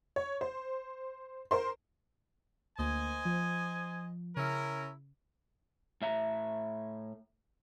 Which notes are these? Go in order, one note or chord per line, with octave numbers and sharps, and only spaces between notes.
C#5
C5
A#4 C5 C6
D2 A#3 C5 D#5 G#5
F3
C#3 C#4 E4 A#4
A2 E5 A#5